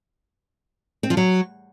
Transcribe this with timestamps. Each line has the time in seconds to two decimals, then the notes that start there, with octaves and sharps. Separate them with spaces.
1.03 C4
1.10 F3
1.17 F#3